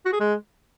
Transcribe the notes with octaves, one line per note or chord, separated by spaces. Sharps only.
F#4
G#4
G#3